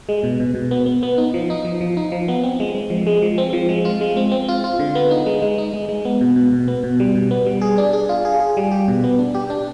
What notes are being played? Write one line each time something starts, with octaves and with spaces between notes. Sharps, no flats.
G#3
B2
B2
B2
B3
B3
B3
D#4
F3
D#4
F3
F3
D#4
F3
B3
C4
G#3
G#3
F3
G#3
F3
C4
F3
G#3
F4
G#3
C4
C4
F4
F4
D3
B3
D#4
G#3
G#3
D#4
G#3
G#3
B3
B2
B2
B2
B3
B2
G3
B2
B3
G3
G#4
D4
G#4
F4
G#4
G#4
G3
G4
B2
B3
D4
G4
D4